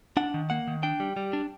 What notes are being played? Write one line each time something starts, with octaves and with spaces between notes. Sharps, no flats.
D4 F#5
D#3
A#3 F#5
D#3
D4 G5
G3
G3
D4